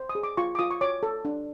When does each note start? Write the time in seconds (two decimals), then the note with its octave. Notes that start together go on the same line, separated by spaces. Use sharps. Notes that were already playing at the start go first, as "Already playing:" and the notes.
Already playing: C5
0.09 D#6
0.15 G#4
0.23 D6
0.37 F4 C#6
0.55 D6
0.59 F4 D#6
0.71 C#6
0.81 C#5 D6
1.03 A4
1.25 D4